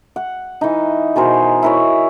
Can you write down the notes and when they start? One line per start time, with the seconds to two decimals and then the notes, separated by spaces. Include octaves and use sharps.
0.16 F#5
0.61 E3 D#4
1.16 B2 G#4 A#4 C5
1.63 E4 A#4 C#5